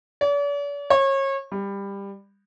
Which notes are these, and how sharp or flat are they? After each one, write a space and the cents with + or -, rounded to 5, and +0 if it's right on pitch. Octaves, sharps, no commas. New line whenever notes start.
D5 -45
C#5 -30
G3 +20